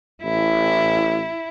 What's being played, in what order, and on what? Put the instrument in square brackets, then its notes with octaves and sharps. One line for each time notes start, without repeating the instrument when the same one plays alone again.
[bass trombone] A1 [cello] E4